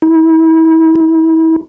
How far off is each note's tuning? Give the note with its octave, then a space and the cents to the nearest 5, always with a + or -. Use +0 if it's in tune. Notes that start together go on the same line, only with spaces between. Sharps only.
E4 -35
E4 -35